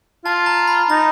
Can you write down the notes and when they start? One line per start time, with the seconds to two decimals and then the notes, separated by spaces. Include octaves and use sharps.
0.25 F4 A5
0.46 A#5
0.68 B5
0.90 D#4 A#5